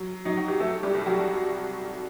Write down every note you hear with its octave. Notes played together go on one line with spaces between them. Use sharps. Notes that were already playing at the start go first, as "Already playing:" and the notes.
Already playing: F#3
F#3 D#4
F#4
G4
F#3 A3 A4
G3 G4
C2
F#3 F#4